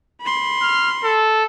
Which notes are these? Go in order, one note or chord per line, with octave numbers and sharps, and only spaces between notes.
B5 C6
F6
A4